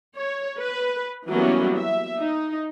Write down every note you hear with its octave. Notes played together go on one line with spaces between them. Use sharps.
C#5
B4
E3 F#3 G3 A#3 B3 C#4
E5
D#4